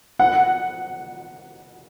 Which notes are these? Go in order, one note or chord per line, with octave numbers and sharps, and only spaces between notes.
F#5